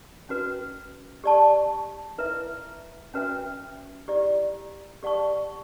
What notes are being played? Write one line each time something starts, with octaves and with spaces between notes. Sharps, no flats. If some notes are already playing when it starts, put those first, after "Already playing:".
C#4 F#4 B4
G4 D5 A5 C#6
E4 B4 E5
C#4 F#4 B4 E5 G5
E4 G4 D5
G4 D5 F#5 A5 C#6